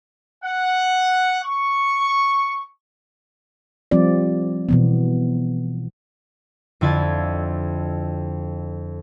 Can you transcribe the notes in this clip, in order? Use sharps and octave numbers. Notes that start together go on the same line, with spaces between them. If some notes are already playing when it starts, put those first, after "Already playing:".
F#5
C#6
F3 G3 C4 F4 D5
B2 E3 B3
F2 D3 E4 F4 G#6 A6